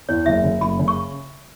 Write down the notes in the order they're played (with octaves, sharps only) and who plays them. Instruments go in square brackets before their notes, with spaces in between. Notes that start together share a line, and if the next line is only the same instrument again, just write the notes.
[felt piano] E2 [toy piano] C#5
[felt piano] F#1 [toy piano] E5
[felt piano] C#3
[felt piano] F#1 [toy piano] B5
[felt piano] C#3
[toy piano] C#6